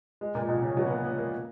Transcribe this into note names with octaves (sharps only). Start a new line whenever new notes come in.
G#3
A#2
B2
C#3
F#3
B3
A#3
B3
A#3